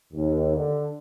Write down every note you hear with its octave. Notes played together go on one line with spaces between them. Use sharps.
D#2
D3